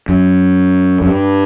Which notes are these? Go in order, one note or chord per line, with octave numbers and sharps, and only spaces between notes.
F#2
F#2
G2